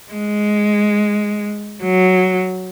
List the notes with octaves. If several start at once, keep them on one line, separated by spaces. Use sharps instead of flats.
G#3
F#3